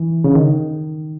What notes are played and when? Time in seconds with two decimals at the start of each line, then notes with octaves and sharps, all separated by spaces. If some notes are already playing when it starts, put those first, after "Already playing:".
Already playing: E3
0.24 C#3
0.35 D#3